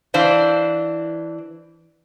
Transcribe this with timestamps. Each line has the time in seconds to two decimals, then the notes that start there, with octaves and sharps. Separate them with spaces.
0.14 E3 D4 C5 F5